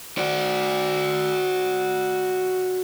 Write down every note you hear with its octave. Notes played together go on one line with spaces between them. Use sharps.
F#4 D5